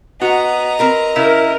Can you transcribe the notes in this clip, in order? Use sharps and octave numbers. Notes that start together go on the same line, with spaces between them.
B3 F#4 D#5 A#5
C4 A#4 B4
C#3 E4 A#4